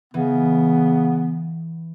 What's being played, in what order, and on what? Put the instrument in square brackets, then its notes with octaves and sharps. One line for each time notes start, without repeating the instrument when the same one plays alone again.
[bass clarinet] C#3 [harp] E3 [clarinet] B3